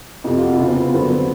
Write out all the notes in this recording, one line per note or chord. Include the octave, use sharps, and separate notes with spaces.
F2 C3 F3 G4
F4
F#4
E4
E2 C#3 F3 F4
C4
B3
G2 D3 F#3 B3
C4